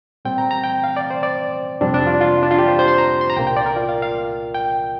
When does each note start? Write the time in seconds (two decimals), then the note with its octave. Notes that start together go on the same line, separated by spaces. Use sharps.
0.25 A#2 G3 C4 G5
0.38 A#5
0.51 A#5
0.64 G5
0.84 F5
0.97 D5
1.10 C5
1.23 D5
1.81 F2 C3 G3 C4 D4
1.94 D4
2.07 F4
2.21 F4
2.43 D4
2.51 F4
2.59 G4
2.68 C5
2.79 C5
2.88 C6
2.98 A#5
3.21 C6
3.30 A#5
3.37 C2 A#2 A#3 G5
3.47 G5
3.57 D5
3.66 A#4
3.76 F4
3.89 F5
4.02 F5
4.54 G5